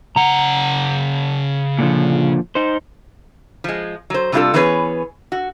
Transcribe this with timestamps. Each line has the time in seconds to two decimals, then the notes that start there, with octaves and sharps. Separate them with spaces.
0.16 C#3 F#5 A#5
1.79 A#2 D3 F3
2.55 D#4 C5
3.64 F3 G#3
4.10 F#3 C5
4.32 C3 G3 D4 E4 F4 A4
4.54 E3 B3 C#4 G#4 B4 C#5
5.32 F#4